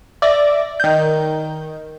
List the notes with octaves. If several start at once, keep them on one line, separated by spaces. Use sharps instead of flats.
D5 E5 A#6
D#3 G6